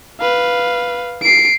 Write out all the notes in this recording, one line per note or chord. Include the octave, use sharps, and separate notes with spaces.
B4 F5
C7 D7